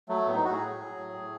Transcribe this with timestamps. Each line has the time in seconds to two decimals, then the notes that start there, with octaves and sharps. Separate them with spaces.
0.09 F#3 A3
0.26 A2 B3
0.35 D#4
0.44 A2 F#4
0.53 G#4
0.61 F#3
0.79 F#3
0.97 A2
1.14 A2